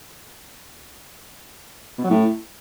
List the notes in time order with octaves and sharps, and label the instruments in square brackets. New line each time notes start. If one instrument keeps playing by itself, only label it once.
[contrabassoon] B2
F#3
A2